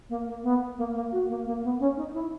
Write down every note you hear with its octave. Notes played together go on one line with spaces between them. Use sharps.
A#3
A#3
B3
A#3
A#3
F#4
A#3
A#3
B3
C#4
D#4
E4